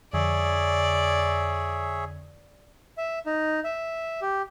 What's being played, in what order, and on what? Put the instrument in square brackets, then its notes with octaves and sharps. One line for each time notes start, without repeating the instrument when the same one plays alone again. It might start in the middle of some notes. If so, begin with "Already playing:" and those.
[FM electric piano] F2 D3 [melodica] G#4 C#5 E5 [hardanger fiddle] D5
[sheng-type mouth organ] E5
D#4
E5
G4